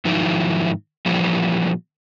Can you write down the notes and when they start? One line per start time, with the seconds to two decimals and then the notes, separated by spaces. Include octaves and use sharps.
0.05 G#2 D#3 F3 F#3 D#4 E4
1.06 A#2 E3 F3 G3